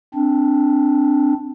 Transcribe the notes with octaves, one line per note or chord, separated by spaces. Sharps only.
C4 D4